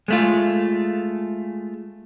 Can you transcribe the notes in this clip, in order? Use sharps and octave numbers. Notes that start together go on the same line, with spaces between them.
G#3 A3 F4